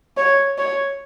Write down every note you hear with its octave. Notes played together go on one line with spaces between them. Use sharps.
C#5
C#5